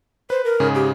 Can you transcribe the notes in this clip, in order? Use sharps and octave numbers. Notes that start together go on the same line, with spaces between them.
B4 C5
A#4
G#2 C#3 G#4
G4